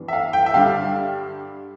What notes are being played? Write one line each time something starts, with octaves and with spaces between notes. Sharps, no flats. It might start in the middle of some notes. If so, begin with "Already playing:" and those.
Already playing: G2 E3 B3 D4
E5
F5
G5
E5
G2 D3 G3 D4 F5